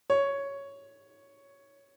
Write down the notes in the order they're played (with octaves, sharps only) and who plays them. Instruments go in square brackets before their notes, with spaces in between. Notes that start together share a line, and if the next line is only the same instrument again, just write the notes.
[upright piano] C#5